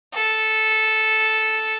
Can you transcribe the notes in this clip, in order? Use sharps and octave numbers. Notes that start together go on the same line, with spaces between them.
A4